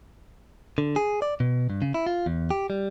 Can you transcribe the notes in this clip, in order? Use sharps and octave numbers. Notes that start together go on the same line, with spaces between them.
D3
G#4
D5
B2
G2
C#3
E4
F4
E2
G4
G3